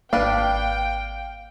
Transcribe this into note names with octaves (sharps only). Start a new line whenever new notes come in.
G#1 A#3 D4 B4 F5 G5